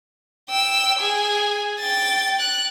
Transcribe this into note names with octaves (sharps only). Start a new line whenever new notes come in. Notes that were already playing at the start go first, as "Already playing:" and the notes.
G5 E6
G#4 G#5
G5 A6
F#6